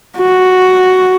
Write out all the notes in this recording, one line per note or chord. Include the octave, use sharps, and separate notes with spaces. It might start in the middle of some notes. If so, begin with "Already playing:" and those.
F#4